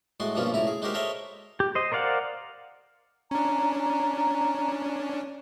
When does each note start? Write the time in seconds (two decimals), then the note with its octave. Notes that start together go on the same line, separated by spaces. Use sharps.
0.20 A2 G#3 F#4 C6
0.35 G2 B2 F3 A#3 C#4 F4
0.51 C#2 A2 E4 A#5
0.67 G#4
0.82 G#3 D#4 F#4 G4 A#4 C5
0.94 A4 A#4 C5 C#5 D#5 E5
1.60 G4
1.75 C5 D#5
1.92 A#4 C5 D5 F5 F#5
3.31 C#4 D4 A#5